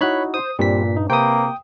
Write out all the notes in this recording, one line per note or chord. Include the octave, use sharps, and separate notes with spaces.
D#4 E4 F#4 C#5 B5 F#6
C5 D#6
G2 A#2 G3 C4 B6
D#4
C3 A#3 B4 C5 G5 D#6